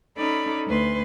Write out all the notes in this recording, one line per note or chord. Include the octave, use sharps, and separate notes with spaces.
C#4 D#4 A4 D5 B5
D2 B4 C6